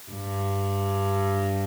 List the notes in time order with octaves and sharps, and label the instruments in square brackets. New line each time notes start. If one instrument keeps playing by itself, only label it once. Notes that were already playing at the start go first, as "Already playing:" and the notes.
[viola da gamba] G2